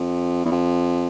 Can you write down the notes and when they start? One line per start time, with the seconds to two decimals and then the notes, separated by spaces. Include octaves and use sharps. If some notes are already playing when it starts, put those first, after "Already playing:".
Already playing: F2
0.45 E2
0.51 F2